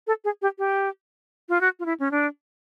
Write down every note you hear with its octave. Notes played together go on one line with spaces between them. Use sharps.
A4
G#4
G4
G4
F4
F#4
F4
E4
C#4
D4